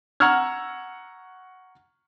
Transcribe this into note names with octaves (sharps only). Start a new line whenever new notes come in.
F#5 A#5 C#6 E6 F6 G#6